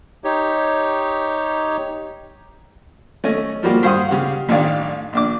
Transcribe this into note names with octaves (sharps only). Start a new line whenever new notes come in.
D#4 G4 C#5
A3 C#4 D#5
F3 G3 A#3 F#4 G4
G2 C5 F5 F#5 C6 D#6
C#3 G4 F5 F#5
A1 D#3 D4 D5 F5
A#1 D4 D6